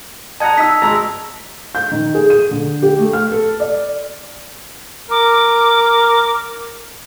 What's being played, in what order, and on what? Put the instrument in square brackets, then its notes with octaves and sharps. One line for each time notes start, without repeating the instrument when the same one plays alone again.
[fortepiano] D#5 F#5 A#5 [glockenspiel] A5 G#6
[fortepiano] D#4 [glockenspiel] E6 B6
[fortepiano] G#1 G#3 A#5
[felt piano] G6
D#3
G#4
D#7
D3
G4
A3
F6
A4
D5
[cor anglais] A#4 [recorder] D6